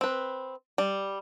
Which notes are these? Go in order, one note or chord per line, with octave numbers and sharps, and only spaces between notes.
C4 B4
G3